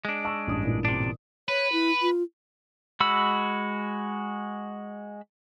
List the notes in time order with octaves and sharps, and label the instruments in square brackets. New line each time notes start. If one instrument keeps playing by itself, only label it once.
[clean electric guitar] G#3 D4
[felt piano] A5 C#6 E6
[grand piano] A1 G2 D#6
[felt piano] A#2 E3
[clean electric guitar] C3 D4
[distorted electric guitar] B4 [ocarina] C#5
[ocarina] E4
F4
[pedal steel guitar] G#3 F#4 B5 E6